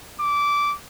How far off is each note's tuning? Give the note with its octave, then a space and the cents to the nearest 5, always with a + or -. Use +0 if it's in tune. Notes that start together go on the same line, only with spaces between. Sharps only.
D6 -15